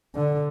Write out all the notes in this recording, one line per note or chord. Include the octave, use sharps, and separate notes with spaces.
D3